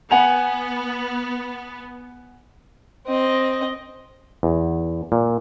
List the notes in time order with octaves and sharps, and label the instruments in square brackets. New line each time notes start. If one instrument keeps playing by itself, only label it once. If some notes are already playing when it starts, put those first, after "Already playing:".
[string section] B3 [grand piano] F#5 G#5 F7
[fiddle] C4 D#5
[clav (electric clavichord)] E2
A#2